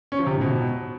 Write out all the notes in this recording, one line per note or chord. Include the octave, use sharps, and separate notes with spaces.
C#4
F3
C3
G#2
B2